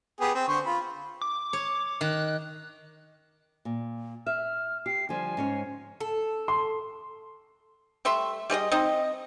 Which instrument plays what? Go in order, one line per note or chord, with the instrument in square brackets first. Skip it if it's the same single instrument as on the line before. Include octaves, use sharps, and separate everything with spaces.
[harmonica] B3 G4 G#4
C4
D3 C5 C#6
F4 B5
[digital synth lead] D6
[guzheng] C#5
[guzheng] D#3 [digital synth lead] F#6
[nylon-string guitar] A#2
[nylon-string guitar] E5 [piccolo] F6
[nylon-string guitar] G4 [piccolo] C7
[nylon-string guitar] D3 F3 G3 [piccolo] G#5
[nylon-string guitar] G#2 C#4 C#5
[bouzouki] A4
[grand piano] C6
[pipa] G3 A3 E5 C6
G3 A3 G#4 D#5
C4 D#4 D#5